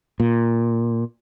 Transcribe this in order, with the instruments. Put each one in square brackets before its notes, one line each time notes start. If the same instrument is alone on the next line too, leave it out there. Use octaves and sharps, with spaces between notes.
[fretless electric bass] A#2